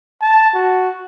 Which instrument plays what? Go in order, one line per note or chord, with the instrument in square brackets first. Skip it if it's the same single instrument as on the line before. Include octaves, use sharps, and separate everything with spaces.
[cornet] A5
F#4